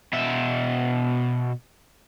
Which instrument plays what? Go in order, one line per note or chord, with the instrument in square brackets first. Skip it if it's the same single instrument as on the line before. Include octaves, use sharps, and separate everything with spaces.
[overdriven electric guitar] B2 E5